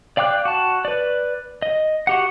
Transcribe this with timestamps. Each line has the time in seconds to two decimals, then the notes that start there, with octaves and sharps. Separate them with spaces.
0.17 D5 F5 G5 D6 F#6
0.45 F#4 A5
0.85 B4 D5
1.62 D#5
2.07 F#4 G4 F#5